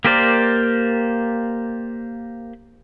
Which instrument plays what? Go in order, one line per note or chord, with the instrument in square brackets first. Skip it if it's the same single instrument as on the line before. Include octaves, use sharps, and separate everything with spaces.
[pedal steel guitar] A#3 G4 A#4 C5 D5